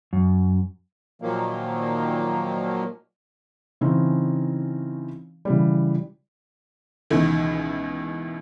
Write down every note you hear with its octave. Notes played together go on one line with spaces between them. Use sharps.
F#2
A#2 D#3 F3 F#3 A#3
C#3 E3 C4 C#4 D#4
C#3 E3 G3
C#2 B2 D#3 E3